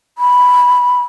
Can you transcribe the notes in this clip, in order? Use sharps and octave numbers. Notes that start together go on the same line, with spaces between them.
B5